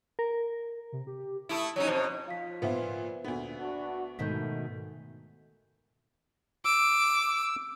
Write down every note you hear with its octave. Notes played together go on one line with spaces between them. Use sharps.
A#4
C3
G4
A3 E4 D#6
F#3 C#4 D#4 C#5
F2 B2 C5
F3 F4 F5 B6
A#2 B3 B4 C5 E5
D2 A#2 D3 B3
D4 F#4
G#2 B2 D#3 A3 G6 B6
D6 E6